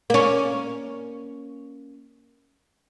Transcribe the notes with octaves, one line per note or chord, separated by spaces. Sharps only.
A#3 C#4